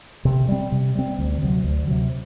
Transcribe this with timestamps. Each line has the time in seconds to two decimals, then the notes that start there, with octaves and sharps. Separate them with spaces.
0.25 C3
0.48 G3 C4
0.72 C3
0.95 G3 C4
1.19 D2
1.42 C3 F#3
1.64 D2
1.88 C3 F#3